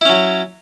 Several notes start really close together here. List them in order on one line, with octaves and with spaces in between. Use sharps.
E4 C#4 F#3